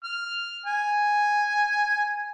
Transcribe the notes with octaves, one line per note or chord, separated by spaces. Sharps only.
F6
G#5